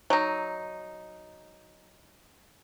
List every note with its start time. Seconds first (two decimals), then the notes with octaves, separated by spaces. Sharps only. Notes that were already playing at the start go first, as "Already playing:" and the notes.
0.10 F#3 D#4